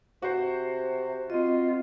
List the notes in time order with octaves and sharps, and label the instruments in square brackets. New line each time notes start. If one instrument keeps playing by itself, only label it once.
[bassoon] C3 [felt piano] F#4 C5
[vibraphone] C4 D#5 [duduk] F4